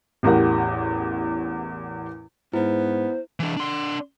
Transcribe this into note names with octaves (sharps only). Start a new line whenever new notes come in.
A1 E2 G4 A#4 F#5
G#2 B3 E4 C5
E3 D4
D4 C6